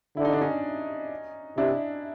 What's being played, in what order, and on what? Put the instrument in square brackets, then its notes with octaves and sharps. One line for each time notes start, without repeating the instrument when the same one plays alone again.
[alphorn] D3 [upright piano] E4
[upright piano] D#4
D4
C#4 D#4
[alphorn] C3 [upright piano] D4 E4